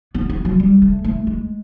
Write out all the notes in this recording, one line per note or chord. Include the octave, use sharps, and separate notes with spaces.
B3
B3
F#3
G3
A3
A3
G#3